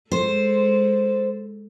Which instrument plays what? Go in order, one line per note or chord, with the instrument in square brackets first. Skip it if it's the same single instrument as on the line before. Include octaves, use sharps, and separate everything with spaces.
[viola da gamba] G#3 A4 [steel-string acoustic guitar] C5